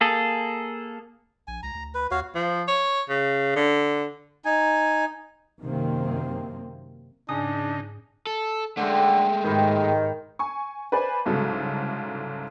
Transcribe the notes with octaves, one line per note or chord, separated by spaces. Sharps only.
A#3 G#4 A4
A#1 G#5
C#2 A#5
D2
B4
D#2 F#4 C#5 F5
F3
C#5
C#3
D3
D#4 G#5
F#2 C3 D#3 A#3 C4
G#2 C#3 D4 D#4 G#5 D#6
A4
D3 G#3 A3 C#4 C5 G5
G#2 D#3 G4 B4 C5
G#5 C#6
B4 C5 D5 G#5
C2 G#2 C#3 F#3 A4